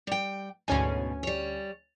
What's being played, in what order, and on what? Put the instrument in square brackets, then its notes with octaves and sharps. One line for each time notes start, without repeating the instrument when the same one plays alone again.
[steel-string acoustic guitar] G3 G5
[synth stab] D2 C#4 G#5 [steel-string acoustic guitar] G#2 B2
[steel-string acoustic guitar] G3 C#5